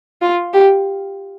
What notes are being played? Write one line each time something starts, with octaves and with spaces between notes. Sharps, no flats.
F4
G4